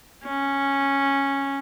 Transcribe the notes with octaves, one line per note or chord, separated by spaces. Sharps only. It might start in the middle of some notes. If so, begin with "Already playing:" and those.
C#4